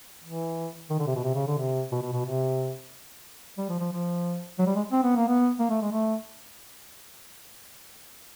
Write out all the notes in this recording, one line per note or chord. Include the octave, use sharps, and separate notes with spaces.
E3
D#3
D3
C3
B2
C3
C#3
D3
C3
B2
B2
B2
C3
G3
F3
F3
F3
F#3
G3
G#3
C4
B3
A#3
B3
A#3
A3
G#3
A3